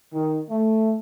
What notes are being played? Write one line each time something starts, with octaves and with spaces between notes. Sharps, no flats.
D#3
A3